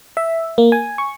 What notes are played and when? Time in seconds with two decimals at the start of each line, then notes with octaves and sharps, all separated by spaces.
0.17 E5
0.58 A#3
0.72 G#5
0.98 C#6